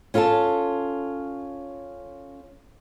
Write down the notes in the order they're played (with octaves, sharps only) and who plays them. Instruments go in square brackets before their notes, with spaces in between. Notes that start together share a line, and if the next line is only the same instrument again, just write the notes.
[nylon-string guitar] C#4 F4 A4 C#5 A5